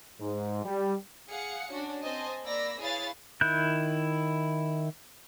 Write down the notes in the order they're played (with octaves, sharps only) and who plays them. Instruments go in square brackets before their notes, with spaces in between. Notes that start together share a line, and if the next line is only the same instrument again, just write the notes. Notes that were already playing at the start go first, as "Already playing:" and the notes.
[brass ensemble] G#2
G3
[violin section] G#4 F5 F#5 C#7
C#4 D4 F#4
C4 C5 D#5 G#5 A5
A#3 D5 B5 E6 A#6
E4 G#4 B4 C#5 F5 A6
[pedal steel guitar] D#3 E4 F#6 G6